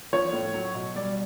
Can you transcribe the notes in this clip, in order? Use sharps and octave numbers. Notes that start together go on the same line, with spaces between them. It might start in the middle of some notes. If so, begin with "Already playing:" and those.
F3 C#5
A2
F#3
B2
G3 D5